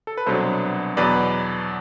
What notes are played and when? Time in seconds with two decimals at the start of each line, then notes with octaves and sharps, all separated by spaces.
0.07 A4
0.17 B4
0.26 C2 B2 F#3 B3 D4 A4 C5
0.97 E2 B2 F#3 B4 D5